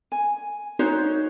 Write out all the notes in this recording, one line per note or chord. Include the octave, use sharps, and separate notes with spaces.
G#5
D#4 F#4 C5 C#5